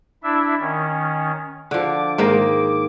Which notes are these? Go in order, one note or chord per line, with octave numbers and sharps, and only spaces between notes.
D4 E4 E5
D#3 C#4
D3 F3 D6
G#2 D#3 A#3